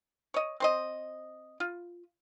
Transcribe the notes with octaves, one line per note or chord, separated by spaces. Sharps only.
C#5 D#5
C4 C5 D#5
F4